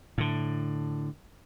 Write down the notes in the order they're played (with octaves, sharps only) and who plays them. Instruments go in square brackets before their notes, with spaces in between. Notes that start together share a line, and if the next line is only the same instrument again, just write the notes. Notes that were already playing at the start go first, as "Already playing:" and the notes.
[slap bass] A2 D3